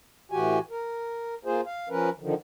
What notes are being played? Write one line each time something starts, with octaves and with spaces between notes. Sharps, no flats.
A2 E3 F#4 G4 G#5
A#4
A#3 F4 G#4 C5
F5
F3 C#4 A#4 B4
D3 D#3 F3